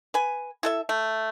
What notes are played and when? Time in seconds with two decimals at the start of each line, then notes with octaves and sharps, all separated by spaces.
0.14 B4 G#5
0.63 E4 A4 E5
0.89 A3